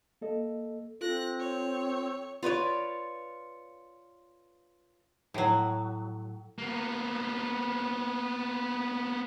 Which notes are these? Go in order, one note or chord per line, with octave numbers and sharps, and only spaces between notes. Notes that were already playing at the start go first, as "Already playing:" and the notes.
A#3 A4 D#5
C4 F4 A4 F#6 A#6
C#5
F4 B4 C#5 D5
A2 F#3
A#3 B3